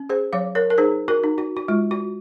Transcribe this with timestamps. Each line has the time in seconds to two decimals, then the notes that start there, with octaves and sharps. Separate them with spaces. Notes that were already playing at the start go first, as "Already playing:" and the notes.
Already playing: C#4
0.09 G#4 C5
0.33 F#3 C#5 F5
0.55 A#4 C#5
0.70 A#4
0.78 D#4 G#4 C5
1.08 F#4 A#4
1.23 D#4
1.38 F#4
1.57 F#4
1.68 G#3 F4
1.91 F#4